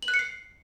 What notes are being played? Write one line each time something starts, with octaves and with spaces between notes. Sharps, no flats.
F#7
F#6
C#7
C7